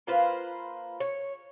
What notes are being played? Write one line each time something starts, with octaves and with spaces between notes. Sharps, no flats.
A#3 F4 B4 C5
C#5